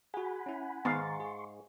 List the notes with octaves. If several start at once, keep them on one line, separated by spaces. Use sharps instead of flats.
F#4 G#4 F#5 G#5 B5
C#4 E4
G#2 D#3 B3 F5 A#5 C6 C#6 A6
G#4